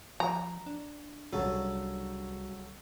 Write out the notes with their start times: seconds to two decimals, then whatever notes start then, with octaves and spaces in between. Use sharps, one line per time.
0.20 F3 A#5
0.66 D4
1.33 C2 C#3 F#3 G3 F#4 A4